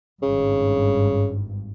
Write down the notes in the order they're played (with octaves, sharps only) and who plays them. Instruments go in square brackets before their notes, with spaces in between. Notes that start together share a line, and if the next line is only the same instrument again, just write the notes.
[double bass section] G#1 G2 [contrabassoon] C#3